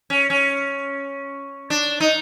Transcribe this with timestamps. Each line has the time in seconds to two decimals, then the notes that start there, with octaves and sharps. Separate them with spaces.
0.10 C#4
0.30 C#4
1.70 D4
2.00 D#4